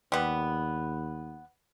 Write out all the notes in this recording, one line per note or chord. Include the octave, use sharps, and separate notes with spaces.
D#2 G3 B3